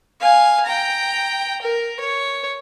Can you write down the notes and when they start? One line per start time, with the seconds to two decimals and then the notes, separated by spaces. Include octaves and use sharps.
0.21 F5 G#5
0.66 G5 A#5
1.62 A#4
2.00 C#5